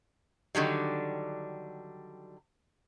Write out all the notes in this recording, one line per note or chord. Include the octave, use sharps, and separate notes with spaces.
D3 D#3 F#3 G3